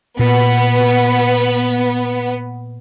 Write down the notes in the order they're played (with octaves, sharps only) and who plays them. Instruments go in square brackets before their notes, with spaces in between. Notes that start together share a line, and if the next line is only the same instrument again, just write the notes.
[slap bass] A#2 [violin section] B3